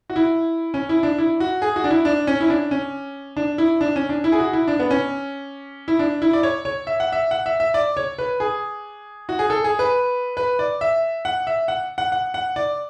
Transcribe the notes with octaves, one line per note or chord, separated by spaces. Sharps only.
F#4
E4
C#4
E4
D4
E4
F#4
G#4
F#4
D4
E4
D4
C#4
E4
D4
C#4
D4
E4
D4
C#4
D4
E4
G#4
F#4
E4
D4
B3
C#4
E4
D4
E4
D5
C#5
C#5
E5
F#5
E5
F#5
E5
E5
D5
C#5
B4
G#4
F#4
G#4
A4
G#4
B4
B4
D5
E5
F#5
E5
F#5
F#5
F#5
F#5
D5